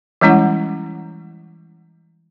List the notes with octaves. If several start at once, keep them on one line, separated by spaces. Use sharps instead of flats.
E3 G3 G#3 C#4 E4 F#5